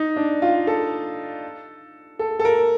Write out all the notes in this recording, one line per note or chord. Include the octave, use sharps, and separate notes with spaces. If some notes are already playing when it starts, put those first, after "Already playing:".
Already playing: D#4
D4
F4
A4
A4
A4
A#4